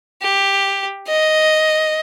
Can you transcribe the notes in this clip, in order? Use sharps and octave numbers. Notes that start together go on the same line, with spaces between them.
G4
D#5